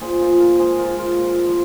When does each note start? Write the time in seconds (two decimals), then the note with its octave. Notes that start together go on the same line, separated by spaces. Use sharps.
0.01 A#2 G#4 C5
0.21 F4 A#4
0.30 F3
0.39 F4 A#4
0.59 G#2 G#4 C5
0.78 F4 A#4
0.88 F3
0.98 F4 A#4
1.18 A#2
1.46 F3